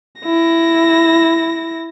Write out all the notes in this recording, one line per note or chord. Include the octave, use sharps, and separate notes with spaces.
E4 A#6